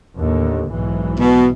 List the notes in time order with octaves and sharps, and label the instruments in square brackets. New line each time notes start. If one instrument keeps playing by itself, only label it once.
[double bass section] D#2 A2 D3
B1 G#2 E3
[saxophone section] B2